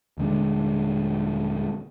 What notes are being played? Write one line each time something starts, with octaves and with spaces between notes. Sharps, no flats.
D#1 D3 G#3 D4